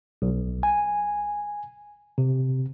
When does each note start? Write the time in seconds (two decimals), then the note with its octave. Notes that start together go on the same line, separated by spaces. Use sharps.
0.22 B1
0.63 G#5
2.18 C3